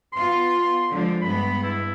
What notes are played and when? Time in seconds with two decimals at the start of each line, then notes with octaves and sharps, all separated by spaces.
0.13 B3 F4 C6
0.89 D3 F3 G#3
1.22 G2 G#3 B3 B5
1.63 E4